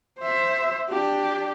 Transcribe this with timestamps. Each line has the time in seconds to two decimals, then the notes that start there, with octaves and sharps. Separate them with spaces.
0.19 C5 E5
0.89 D4 G4